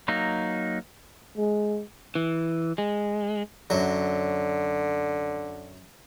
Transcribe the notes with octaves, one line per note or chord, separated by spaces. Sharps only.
F#3 A#3 D#4
G#3
E3
G#3
F#2 D3 F#3